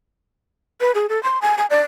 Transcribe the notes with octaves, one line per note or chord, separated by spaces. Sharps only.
B4
G#4
A4
C6
G#5
G#5
D5